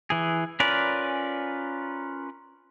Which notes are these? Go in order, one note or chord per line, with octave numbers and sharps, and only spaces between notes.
E3 G#4
C#4 F4 A#4 B4 D5